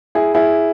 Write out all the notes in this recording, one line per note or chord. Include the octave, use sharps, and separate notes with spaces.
E4 G#4
E4 G#4